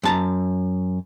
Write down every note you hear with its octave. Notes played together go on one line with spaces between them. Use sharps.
F#2 A5 A#5